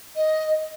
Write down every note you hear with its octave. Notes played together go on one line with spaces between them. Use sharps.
D#5